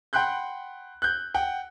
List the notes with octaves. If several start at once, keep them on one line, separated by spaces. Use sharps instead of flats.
F#5 G5 B5 C6 F#6 G6
F#6 G6
F#5 G5